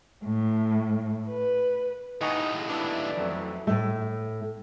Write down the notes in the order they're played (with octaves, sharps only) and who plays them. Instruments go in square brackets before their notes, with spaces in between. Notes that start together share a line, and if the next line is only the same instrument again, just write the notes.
[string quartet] A2
B4
[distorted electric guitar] D#2 A2 [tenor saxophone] D#4 [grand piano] F#5 G#5 C#6
[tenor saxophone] G#3
[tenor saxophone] B3 [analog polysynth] D4 E4
[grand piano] F2 F#3 A3
[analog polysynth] E3
[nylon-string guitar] A2 A3